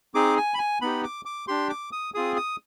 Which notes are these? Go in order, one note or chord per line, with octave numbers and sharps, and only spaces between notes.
C4 D#4 G#4 D6
G#5
B5
G#5
B3 D#4 G4 B5
D6
D6
D4 G4 C6
D6
D#6
C4 F4 G#4 D#6
D#6